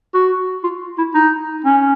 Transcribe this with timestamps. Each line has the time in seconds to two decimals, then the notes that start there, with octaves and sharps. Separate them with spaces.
0.14 F#4
0.64 F4
0.98 E4
1.14 D#4
1.65 C#4